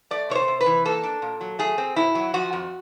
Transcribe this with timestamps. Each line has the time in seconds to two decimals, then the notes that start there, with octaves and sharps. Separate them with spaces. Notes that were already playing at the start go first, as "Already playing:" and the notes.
0.11 A3 D5
0.30 C3 C#5
0.35 C5
0.48 C3
0.61 B4
0.66 E3
0.85 A#3 A4
1.03 D4
1.22 A#2
1.41 F#3
1.59 A3 G#4
1.78 C4
1.96 B2 E4
2.15 F#3
2.34 F3 F#4
2.53 F2